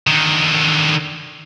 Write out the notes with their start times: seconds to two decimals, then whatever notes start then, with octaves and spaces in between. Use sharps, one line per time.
0.07 D3 D#3